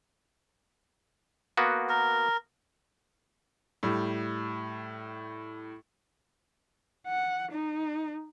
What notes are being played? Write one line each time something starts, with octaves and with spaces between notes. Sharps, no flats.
A#3 B3 F#4
A#4
A2 G3
F#5
D#4